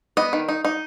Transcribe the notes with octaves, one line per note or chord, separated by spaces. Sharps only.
B3 D#5
D#3
D#4
D#4